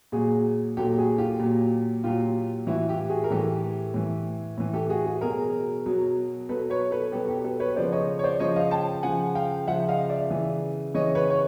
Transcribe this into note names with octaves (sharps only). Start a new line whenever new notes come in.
A#2 F#3 F#4 G#4
A#2 F#3 G4 A4
F#4 G#4
F4 G4
A#2 F#3
A#2 F#3 F4 G4
A2 E3 E4 F#4
F4 G4
F#4 G#4
A#4
A2 E3 G4 A4
A2 E3
A2 E3
G4 A4
F#4 G#4
F#4 G#4
B2 F#3 G#4 A#4
B2 F#3
B2 F#3 A4 B4
B4 C#5
A4 B4
B2 F#3 G4 A4
G4 A4
A4 B4
B4 C#5
C#3 F3 C5 D5
C#5 D#5
C#5
C5 D5
C#3 F3 C#5 D#5
D#5 F5
G5 A5
C#3 F3 F#5 G#5
F5 G5
C#3 F3 E5 F#5
D#5 F5
D5 E5
C#3 E3
C#3 E3 C#5 D#5
B4 C#5
C#5